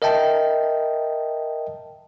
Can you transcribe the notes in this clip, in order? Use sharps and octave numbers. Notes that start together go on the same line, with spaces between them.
A#4 D#5 E5 G5 A5